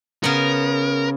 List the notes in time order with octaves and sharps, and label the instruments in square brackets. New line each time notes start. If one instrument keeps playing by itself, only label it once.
[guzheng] C#3 B3 [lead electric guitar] A#4